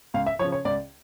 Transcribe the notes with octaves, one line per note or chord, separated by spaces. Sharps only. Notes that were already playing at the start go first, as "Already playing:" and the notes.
C#2 F5
E5
C#3 F3 C#5
C#5
C#2 D5